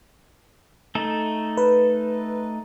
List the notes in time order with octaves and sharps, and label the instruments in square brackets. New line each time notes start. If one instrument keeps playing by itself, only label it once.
[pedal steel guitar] A3 D#4 A4
[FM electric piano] B4